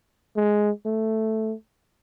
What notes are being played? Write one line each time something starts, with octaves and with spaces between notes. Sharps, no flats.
G#3
A3